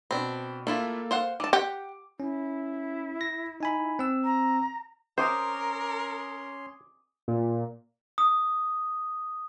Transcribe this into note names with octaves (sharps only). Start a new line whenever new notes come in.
B2 C4 D4 B5
A3 A#3 E4 F4 A4
C5 F5 F#5
E3 A5 D6
G4 F#5
C#4 E4
A#6
D#4 G#5 B5
C4 E6
A#5
C#4 A#4 C5 C#5 C6 D6 D#6
A#2
D#6